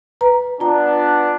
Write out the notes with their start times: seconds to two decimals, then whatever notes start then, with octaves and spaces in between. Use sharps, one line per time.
0.21 B4 A#5
0.60 B3 D4 F4 A#5